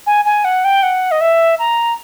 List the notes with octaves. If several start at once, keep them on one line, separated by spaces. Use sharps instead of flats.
G#5
G#5
F#5
G5
F#5
D#5
E5
A#5